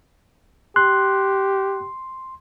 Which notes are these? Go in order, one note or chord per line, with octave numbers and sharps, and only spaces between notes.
G4 C6 F#6